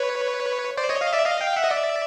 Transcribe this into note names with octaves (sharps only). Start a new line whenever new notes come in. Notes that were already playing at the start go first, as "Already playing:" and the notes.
Already playing: B4 C#5
C5 D5
C#5 D#5
D#5 F5
D5 E5
D#5 F5
F5 G5
E5 F#5
D#5
D5 E5